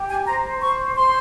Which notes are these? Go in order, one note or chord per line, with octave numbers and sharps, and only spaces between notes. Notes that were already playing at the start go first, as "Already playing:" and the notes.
Already playing: G4
G#5
C5 A#5
C5 C#6
C5 C6